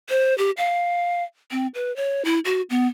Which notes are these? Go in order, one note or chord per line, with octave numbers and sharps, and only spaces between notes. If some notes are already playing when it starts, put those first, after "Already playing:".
C5
G4
F5
C4
B4
C#5
E4
F#4
B3